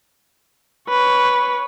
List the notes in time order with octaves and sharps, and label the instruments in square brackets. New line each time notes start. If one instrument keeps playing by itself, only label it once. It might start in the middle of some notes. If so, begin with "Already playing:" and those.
[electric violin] B4 C#5